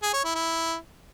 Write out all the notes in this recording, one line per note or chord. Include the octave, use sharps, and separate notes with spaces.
G#4
C#5
E4
E4